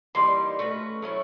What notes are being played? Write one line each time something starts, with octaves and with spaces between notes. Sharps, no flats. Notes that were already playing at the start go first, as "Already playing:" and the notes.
E3 G3 A#3 D#4 C6
A3 C#4 F#4 B4
F#3 A3 C#4 E4